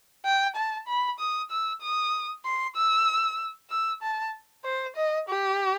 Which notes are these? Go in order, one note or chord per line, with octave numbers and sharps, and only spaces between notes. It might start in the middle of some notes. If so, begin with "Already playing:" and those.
G5
A5
B5
D#6
E6
D#6
C6
E6
E6
A5
C5
D#5
G4